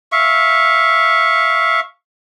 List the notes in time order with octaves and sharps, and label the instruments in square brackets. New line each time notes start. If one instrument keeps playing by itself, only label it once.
[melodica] E5 F5 C#6